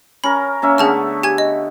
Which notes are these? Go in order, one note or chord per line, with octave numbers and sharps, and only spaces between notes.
C#4 A#4 B5
A#3 C#4 E5
D3 A3 B3 G#4 A5 F6
G4 G#5 G#6
D#5